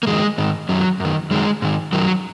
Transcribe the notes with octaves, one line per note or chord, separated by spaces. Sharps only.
A#3
F2 D#3 G#3
G#2 D#3
F#2 D#3 F#3
F#2
D#3
F#2 D#3 G#3
G#2 D#3
F#2 D#3 F#3